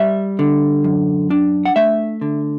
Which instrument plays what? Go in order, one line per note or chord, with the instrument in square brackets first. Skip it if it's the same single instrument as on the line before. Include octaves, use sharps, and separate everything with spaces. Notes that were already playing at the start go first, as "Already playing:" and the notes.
Already playing: [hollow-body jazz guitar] G3 E5
D3
F#2
D4
F#5
A3 E5
D3